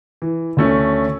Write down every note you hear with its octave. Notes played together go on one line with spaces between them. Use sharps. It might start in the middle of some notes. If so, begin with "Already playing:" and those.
E3
D2 A3 C#4